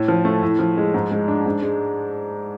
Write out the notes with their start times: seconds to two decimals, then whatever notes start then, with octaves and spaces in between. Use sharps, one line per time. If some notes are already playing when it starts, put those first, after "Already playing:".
Already playing: A2
0.08 F3
0.25 A3
0.42 A2
0.59 F3
0.77 G#3
0.94 G#2
1.11 G#3
1.28 D4
1.46 G#2
1.62 G#3